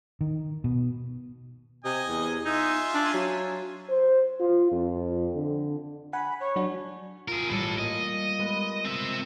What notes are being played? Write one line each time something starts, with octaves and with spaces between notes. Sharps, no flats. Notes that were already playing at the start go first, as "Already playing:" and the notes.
D#3
B2
C3 D#5 G#5
E2
D#4 F4 E5 G#5
D4
F#3
C5
F4
F2
D3
F#5 G#5 B5
C#5
F#3 D4 F#4
F4 G#4 A#4
A1 G3 E4 A4
A#3 D#5
G#3 B3 A#4
C4 E5